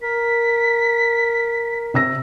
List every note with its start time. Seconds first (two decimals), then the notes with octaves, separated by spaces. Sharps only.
0.02 A#4 B6
1.94 C3 E6 A#6